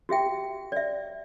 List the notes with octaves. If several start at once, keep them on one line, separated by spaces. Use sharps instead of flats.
F#4 G4 E5 G5
D5 E5